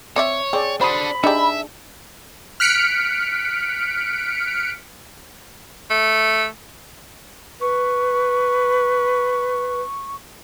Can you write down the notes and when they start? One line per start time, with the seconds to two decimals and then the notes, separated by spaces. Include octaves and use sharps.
0.16 C4 C#5 D5 E5
0.53 C4 G#4 D5
0.81 D4 F#4 A4 C5 B5 C6 D#6
1.24 D4 D#4 G4 G#4 E5 A5
2.60 F6 F#6 B6 C#7 D7
5.90 A3
7.61 B4 C#6